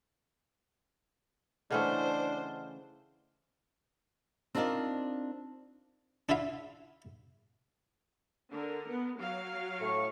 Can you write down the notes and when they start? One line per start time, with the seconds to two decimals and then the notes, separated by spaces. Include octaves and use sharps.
1.71 C#3 E3 A3 D4 C5 D#5 F#5 F6
4.55 C4 D4 D#4 F4 A#4 D5
6.29 D4 E4 F4 E5 F5
8.52 D3 A#4
8.89 B3
9.20 F#3 F5
9.80 A2 C#6